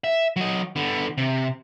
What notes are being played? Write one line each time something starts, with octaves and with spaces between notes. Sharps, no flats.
E5
F#3 D#5
D3 B3
C3